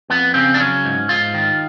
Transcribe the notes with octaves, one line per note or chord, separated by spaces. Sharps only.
F2 B3
C#3 C4
D4
F#3 C#4
G#2
G#2 F4
D#3